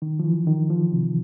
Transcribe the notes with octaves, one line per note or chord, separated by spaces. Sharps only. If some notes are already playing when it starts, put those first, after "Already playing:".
D#3
F3
E3
D#3
F3
C3